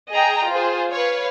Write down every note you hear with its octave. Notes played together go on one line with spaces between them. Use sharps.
G#4 D#5 G5 A#5
F4 G#4 C5
B4 C#5 F5